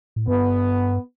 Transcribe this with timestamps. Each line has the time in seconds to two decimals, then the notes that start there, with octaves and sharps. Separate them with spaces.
0.16 A2
0.28 G2 B3